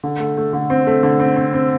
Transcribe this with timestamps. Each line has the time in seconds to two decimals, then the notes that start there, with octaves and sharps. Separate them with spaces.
0.04 D3
0.20 A3
0.37 A3
0.53 D3
0.70 C4
0.87 A3
1.03 D3
1.20 C4
1.36 C4
1.53 C4